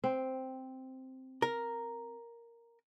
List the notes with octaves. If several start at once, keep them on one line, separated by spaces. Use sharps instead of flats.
C4
A#4